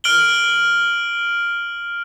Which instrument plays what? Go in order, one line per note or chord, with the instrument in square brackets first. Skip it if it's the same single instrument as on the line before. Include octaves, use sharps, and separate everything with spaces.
[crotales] F6 D7 F#7 G7